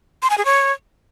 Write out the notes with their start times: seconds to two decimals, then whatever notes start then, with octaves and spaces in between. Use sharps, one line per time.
0.22 C6
0.30 G#5
0.38 G#4
0.45 C#5